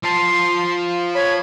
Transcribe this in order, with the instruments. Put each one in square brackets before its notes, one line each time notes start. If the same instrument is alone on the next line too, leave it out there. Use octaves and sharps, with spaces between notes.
[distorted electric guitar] F3 A5 [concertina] C6
[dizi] C#5 [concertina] B5